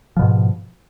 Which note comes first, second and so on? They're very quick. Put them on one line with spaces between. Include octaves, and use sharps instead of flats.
F3 B2 G#2